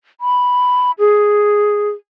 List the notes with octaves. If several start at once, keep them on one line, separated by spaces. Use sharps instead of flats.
B5
G#4